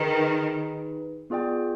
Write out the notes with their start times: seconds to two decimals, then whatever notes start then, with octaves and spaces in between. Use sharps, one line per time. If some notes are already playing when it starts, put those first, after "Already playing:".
Already playing: D#3 D#4 G#4 B4
1.30 B3 F4 G#4 D5 G5